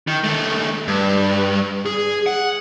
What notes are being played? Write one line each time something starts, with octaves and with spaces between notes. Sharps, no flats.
D#3
D#2 A3
G2
G#4
F#5